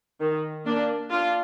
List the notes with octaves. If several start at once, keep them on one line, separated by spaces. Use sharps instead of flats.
D#3
A#3 D4
D4 F4